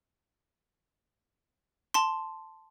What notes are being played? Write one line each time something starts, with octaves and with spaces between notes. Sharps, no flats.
A5 C6